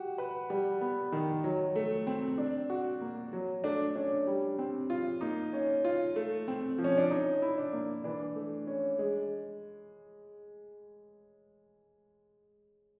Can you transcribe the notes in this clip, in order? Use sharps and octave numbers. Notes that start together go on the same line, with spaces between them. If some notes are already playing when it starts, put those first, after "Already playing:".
Already playing: F#4 G4
B4
G3
B3
D#3
F#3
A3
C4
D4
F#4
A#3
F#3
A3 D4
C#4 D4
G3
C4
F4
A#3 D#4
C#4
F4
A3
C4
F3
C#4
D4
C#4 D#4
E4
D4
A#3
E3 D4
A3
C#4
G#3